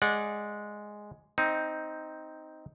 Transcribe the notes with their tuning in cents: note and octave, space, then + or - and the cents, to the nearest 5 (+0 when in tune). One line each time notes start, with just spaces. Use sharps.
G#3 +0 D5 +0 F#5 -25
C4 -5 D#4 +5